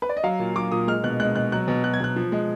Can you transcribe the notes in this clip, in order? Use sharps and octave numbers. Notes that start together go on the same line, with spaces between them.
B4
D5
D#5
F#3 F5
A#2
F#3 D6
A#2 D#6
G#3 F6
B2 F#6
G#3 F#6
B2 F#6
F#3 F#6
B2
F#3 F#6
G#6
B2 F#6
F3
G#3